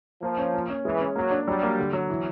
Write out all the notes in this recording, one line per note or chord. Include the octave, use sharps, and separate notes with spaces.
F3 A#3
C#4
A#3
C#4
E3 G#3
C#4
F#3 A#3
D4
F#3 G3
A#3
D3
F#3
E3